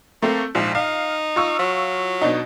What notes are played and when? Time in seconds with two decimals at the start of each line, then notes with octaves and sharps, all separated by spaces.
0.22 A3 A#3 C4
0.55 A#1 G#2 F3
0.75 D#4 F5
1.36 F4 C#6 E6
1.59 F#3
2.22 B2 D4 D#4